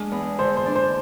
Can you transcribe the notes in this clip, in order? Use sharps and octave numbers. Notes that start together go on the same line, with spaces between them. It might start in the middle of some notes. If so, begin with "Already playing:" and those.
Already playing: G#3 D4
E2
D3 C5
C5
D4
C5